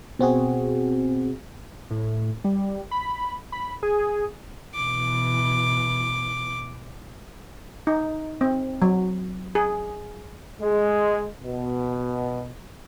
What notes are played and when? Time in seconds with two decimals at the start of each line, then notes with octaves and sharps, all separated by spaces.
0.19 B2 C4 F#4 G#4
1.90 A2
2.44 G3
2.91 B5
3.52 B5
3.83 G#4
4.75 B2 E3 D6
7.87 D#4
8.41 C4
8.82 F#3
9.55 G#4
10.61 G#3
11.44 B2